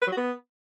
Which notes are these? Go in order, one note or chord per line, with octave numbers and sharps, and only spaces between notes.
B4
F#3
F#4
B3